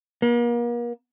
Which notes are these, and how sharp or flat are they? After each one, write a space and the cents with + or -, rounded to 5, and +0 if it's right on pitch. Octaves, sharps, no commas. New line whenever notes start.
A#3 +40